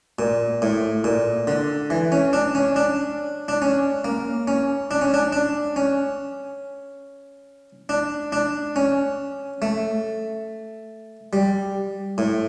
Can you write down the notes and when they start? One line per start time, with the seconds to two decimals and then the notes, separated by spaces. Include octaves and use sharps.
0.19 A#2
0.62 A2
1.04 A#2
1.47 D3
1.90 E3
2.12 C#4
2.33 D4
2.55 C#4
2.76 D4
3.48 D4
3.62 C#4
4.04 A#3
4.47 C#4
4.91 D4
5.01 C#4
5.14 D4
5.32 D4
5.76 C#4
7.89 D4
8.32 D4
8.76 C#4
9.62 A3
11.33 G3
12.18 A2